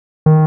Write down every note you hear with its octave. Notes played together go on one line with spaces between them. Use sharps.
D#3